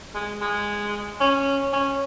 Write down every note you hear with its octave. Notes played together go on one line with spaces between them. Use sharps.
G#3
G#3
C#4
C#4